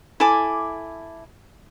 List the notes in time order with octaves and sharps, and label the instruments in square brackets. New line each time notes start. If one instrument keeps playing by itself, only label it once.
[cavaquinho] E4 A4 G#5 D6